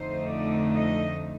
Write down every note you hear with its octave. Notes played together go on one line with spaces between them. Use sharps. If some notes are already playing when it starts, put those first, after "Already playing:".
Already playing: F2 D3 A3 D#4 C5
D5
D#5